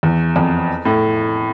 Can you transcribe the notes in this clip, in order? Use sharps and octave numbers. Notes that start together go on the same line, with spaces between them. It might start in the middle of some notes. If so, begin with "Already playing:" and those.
E2
F2
A2